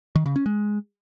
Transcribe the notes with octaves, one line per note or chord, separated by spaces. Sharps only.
D#3
C#3
C#4
G#3